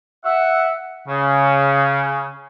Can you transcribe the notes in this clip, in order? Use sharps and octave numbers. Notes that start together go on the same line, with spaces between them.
E5 F#5
C#3